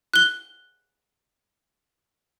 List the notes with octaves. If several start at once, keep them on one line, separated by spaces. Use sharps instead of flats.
F#6 G7